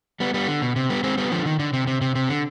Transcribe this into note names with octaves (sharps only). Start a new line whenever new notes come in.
G3 B3
G3 B3
D3
B2
C3
G3 B3
G#3 C4
G3 B3
D3 F3
D#3
D3
C3
C3
C3
C3
D3